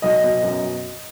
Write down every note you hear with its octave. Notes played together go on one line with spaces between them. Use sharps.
B1 D#5
B2
F#2